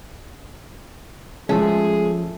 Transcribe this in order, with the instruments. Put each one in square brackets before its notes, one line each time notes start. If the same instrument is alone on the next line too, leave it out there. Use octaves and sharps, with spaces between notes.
[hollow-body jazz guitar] F3 C#4 [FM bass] G#3 [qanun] A3 [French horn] G#4